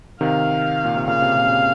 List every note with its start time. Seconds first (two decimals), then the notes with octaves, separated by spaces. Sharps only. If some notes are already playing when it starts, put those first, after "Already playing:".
0.21 C3 D#3 F5
0.85 A#2
0.96 C3
1.07 A#2 C#3 F5
1.22 C3
1.36 A#2
1.46 C#3
1.51 C3